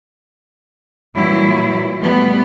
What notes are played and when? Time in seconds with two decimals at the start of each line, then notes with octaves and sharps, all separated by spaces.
1.15 A#2 E3 F#3 G3 E4
2.01 G3 A3 B3